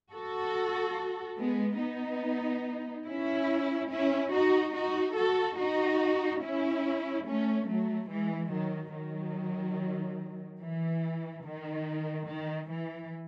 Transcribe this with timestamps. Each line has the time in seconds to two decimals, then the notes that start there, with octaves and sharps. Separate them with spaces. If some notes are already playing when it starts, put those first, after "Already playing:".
0.11 F#4 A4
1.38 G#3 B3
1.79 B3 D#4
3.06 C#4 E4
3.89 C#4 E4
4.31 D#4 F#4
4.73 D#4 F#4
5.15 F#4 A4
5.57 D#4 F#4
6.41 C#4 E4
7.26 A3 C#4
7.67 F#3 A3
8.09 E3 G#3
8.52 D#3 F#3
8.93 D#3 F#3
10.61 E3
11.45 D#3
12.29 D#3
12.71 E3